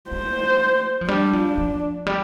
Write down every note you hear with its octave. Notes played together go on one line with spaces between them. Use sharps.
G#3 C5
F3
G3 D4
F3
F3
G3